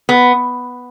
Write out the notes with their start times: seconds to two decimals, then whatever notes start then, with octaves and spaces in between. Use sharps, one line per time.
0.09 B3